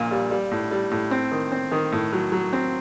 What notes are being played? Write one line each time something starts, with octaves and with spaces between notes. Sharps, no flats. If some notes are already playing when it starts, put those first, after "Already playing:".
Already playing: A#1 A#2
G3
G3
A2
G3
A2
C4
D#3
C4
D#3
A2
F#3
F#3
C4